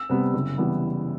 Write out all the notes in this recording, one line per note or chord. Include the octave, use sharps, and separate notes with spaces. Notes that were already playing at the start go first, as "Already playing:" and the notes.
Already playing: E6
C3 G3 B3
F#1
E3 G3 B3